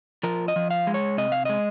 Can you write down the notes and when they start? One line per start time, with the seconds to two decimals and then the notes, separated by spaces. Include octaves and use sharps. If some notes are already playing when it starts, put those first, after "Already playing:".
0.23 F3 A#4
0.48 D#5
0.56 F3
0.71 F5
0.87 G#3
0.94 C#5
1.18 C3 D#5
1.32 F5
1.45 G#3 D#5